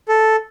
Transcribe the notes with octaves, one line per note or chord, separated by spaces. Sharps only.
A4